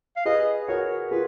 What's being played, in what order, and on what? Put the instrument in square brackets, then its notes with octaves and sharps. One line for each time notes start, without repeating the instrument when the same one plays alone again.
[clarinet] F5
[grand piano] G#4 B4 [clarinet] D#5
[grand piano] F#4 A#4 [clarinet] C#5
[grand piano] F4 G#4 [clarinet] B4